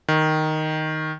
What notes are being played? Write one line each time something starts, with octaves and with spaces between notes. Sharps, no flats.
D#3